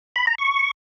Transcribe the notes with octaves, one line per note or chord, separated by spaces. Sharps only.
B5
A#5
C#6